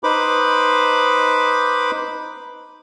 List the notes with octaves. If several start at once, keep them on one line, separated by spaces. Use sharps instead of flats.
D#4 B4 C5 B5 D6